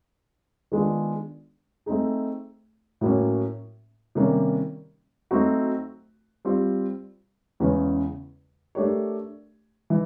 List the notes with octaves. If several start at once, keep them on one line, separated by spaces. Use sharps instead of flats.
D#3 G#3 B3 D4 F4
A3 C4 D#4 G#4
A2 F#3 A#3 C#4
C3 D#3 G3 A#3 C#4
F#3 A3 C4 D#4 F#4
G3 C4 F4
E2 C#3 E3 G#3 C#4
A3 D4 G4 A#4 C#5
E3